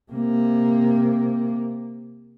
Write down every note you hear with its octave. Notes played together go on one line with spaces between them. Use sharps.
C3 A#3